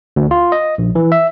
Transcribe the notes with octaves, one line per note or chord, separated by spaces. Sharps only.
D2
F4
D#5
A#1
E3
E5